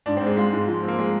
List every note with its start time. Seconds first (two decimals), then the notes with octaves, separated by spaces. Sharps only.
0.06 G#2 D4
0.17 C4
0.21 G#2
0.27 G#3
0.37 G#3 F4
0.53 G#2
0.68 F3
0.83 C4
0.88 A#3
0.99 G#3